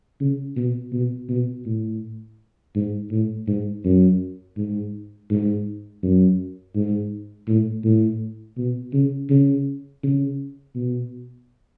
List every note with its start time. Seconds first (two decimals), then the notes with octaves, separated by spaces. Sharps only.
0.20 C#3
0.56 B2
0.93 B2
1.29 B2
1.66 A2
2.76 G#2
3.11 A2
3.48 G#2
3.85 F#2
4.57 G#2
5.30 G#2
6.03 F#2
6.75 G#2
7.48 A2
7.84 A2
8.58 B2
8.94 C#3
9.30 C#3
10.03 C#3
10.75 B2